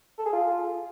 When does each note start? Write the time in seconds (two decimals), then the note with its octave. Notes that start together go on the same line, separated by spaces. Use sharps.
0.19 A4
0.26 G#4
0.33 F4